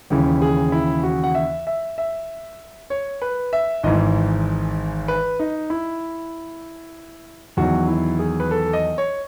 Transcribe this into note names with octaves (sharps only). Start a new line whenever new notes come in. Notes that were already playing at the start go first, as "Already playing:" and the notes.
D#2 C#3 E3
G#4
E4
F#4
F#5
E5
E5
E5
C#5
B4
E5
G#1 G#2 E3 D#5
B4
D#4
E4
E2 D#3 F#3 F#4
E4
G#4
B4
A4
D#5
C#5